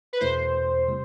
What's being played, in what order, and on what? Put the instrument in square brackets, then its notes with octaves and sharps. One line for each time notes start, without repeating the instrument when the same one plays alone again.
[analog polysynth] B4
[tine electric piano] E2 B2 A3 E4 [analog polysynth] C5
[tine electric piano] C3 G3